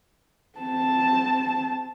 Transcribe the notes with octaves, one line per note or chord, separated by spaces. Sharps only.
C4 A5